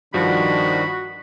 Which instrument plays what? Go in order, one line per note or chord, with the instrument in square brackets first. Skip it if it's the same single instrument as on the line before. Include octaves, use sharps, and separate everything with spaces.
[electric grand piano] G2 F3 [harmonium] D#3 D4 [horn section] F#4 [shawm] B5